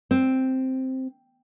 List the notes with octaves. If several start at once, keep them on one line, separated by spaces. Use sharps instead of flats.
C4